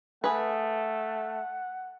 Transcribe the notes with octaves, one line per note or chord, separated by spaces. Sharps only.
A3 G#4 B4 F#5